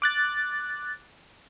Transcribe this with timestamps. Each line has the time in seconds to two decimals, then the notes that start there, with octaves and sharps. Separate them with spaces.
0.02 D6 F#6 A6